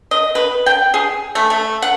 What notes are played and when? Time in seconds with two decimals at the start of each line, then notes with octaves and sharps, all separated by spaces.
0.11 D#5
0.35 B4
0.66 G5
0.94 G#4
1.35 A3
1.50 A3
1.82 F#5